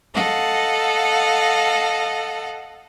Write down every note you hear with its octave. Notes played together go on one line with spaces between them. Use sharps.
A4 D#5 F5 F#5